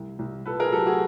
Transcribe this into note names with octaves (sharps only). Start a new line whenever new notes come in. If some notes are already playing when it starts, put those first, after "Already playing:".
Already playing: C2
C2
A#2 A4 B4
G#4 A#4
F#3 G4 A4
F#4 G#4